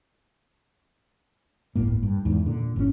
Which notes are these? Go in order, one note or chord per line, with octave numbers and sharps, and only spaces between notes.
D1 G1 A2 A#3
G2
E2 G#2
A#2 D3
G1 A2 D#3 C#4